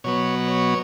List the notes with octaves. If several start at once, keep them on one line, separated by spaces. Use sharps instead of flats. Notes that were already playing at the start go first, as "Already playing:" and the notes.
B2 F#3 B3 C#5
C#5